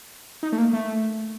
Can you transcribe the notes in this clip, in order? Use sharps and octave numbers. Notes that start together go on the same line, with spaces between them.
D#4
A3
A#3
A3